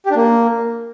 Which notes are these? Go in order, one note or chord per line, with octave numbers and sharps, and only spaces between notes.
G4
D4
A#3